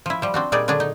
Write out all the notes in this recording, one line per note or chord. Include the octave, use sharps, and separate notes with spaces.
F3 E4
F3 G3
C4 D4 F#4
A#2 G3 D#4 G#4 D5
D3 F#3 D4 G#4
D#4